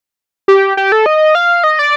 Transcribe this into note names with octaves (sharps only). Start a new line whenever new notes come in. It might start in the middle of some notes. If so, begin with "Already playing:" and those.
G4
G4
A4
D#5
F5
D#5
D5